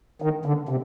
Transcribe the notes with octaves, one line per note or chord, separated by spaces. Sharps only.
D#3
D3
C3